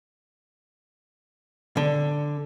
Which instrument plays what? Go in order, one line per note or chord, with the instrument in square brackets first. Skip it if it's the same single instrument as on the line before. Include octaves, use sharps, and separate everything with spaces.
[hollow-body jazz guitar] D3